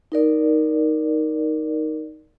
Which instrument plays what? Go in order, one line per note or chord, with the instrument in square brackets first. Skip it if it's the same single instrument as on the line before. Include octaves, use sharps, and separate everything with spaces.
[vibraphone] D#4 A#4 D5